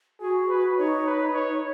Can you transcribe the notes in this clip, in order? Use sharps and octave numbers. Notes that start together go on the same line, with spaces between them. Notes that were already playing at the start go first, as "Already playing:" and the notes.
F#4 G#4
B4
D#4 C#5
B4
C#5
D#4